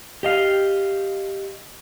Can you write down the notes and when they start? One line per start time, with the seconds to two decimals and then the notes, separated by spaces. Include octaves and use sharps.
0.23 G4 D#5 F5